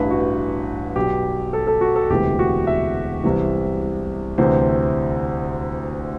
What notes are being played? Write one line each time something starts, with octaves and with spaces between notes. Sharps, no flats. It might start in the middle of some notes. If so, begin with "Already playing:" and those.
Already playing: A1 G2 E3 B4
F#4
B1 B2 G4
A4
A4
F#4
A4
E1 D2 C3 E3 G4
F#4
E5
C2 C3 E3
D2 C3 E3 C5